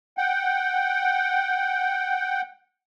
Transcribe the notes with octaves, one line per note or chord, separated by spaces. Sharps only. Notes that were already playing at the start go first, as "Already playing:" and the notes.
F#5 G5